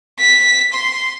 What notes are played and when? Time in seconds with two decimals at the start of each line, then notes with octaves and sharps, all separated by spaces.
0.20 B6
0.74 C6